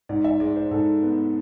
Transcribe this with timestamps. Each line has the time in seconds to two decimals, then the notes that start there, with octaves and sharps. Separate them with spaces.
0.09 G#2 D5
0.24 E5
0.40 G#3 D5
0.56 C5
0.71 G#2 A4
1.03 B3